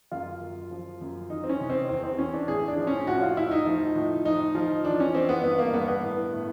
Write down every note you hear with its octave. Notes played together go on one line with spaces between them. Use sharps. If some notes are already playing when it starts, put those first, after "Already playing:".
F#2 F4
F#2
F3
F#2
E3 D#4
C4
C#4
C3
C4
E2 C4
C4
E3 C#4
D4
A2 G#4
D4
F3
C#4
A2 F#4
F4
A2 E4
D#4
F3
A2
F3 D#4
F3
E3 D4
C#4
E3 C4
B3
G2 B3
A#3
G2 B3
B3
A2
A2